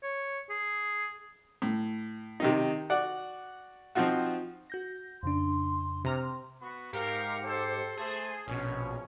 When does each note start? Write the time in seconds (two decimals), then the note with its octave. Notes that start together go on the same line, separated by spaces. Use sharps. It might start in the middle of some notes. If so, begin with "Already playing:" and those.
0.03 C#5
0.50 G#4
1.62 A2
2.40 C3 D#3 D#4
2.90 F#4 D5 F#5
3.95 F3 C4 D#4 F4 F#4
4.70 F#4 G6 A#6
5.23 F2 C#3 D4 C6
6.05 C3 A#5 F6
6.22 C6
6.62 B3 F#4 B5
6.93 G#2 G4 A#4 F5 C#7
7.45 A4 C5
7.97 A3 G#4 C5 A5
8.47 A#1 B2 C#4